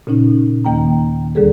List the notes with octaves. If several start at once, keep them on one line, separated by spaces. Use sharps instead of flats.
A#2 C#3 C#4 D#4
D#2 D#3 A#3 G5 A#5
D2 D3 G3 G#4 A4